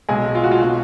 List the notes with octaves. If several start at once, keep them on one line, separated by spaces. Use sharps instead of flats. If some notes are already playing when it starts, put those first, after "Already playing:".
B1 B2 G#3 G#4
F4
F#4
F4
B2 F#4